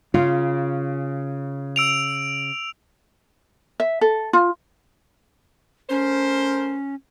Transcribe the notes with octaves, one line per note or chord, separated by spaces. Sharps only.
C#3 F4
E6 D7 F7
E5
A4
F4
A3 C#4 A#4 C5